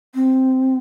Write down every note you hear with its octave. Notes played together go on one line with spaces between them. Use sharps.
C4